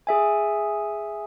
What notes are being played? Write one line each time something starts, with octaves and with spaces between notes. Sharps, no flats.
G#4 E5 G#5